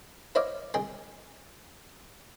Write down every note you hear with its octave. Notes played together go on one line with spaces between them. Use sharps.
E4 C5 C#5 D#5 F5 D6
C2 G#3 G5 G#5 C6